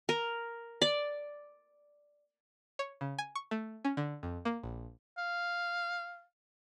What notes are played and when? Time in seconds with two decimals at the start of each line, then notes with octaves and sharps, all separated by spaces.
0.09 A#4
0.82 D5
2.79 C#5
3.01 C#3
3.19 G#5
3.35 C#6
3.51 A3
3.85 C#4
3.97 D3
4.23 F2
4.45 A#3
4.63 A#1
5.18 F5